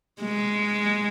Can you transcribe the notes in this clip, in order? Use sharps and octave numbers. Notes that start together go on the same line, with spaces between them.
G#3